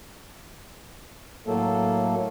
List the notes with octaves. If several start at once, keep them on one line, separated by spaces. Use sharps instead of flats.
A2 F#3 A3 A#3 A4